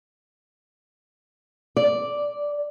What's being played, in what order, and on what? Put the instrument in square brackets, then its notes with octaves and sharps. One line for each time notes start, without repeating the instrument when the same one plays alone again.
[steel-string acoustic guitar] D5